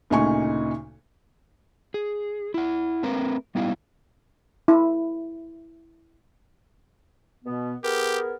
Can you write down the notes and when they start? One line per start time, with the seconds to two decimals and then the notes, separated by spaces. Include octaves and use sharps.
0.10 D2 A#2 C#3 D#4 G#5 C#6
1.94 G#4
2.54 E4 F#5
3.03 A3 C4 A#4 B4
3.55 G3 B3 D#4 E4 F5
4.68 E4
7.45 B2 B3
7.84 B3 G4 G#4 A#4